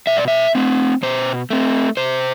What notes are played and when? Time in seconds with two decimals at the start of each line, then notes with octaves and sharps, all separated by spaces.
0.07 B2 E5
0.17 D5
0.28 E5
0.55 A3 C4
1.03 B2 C5
1.50 A3 C4
1.97 C3 C5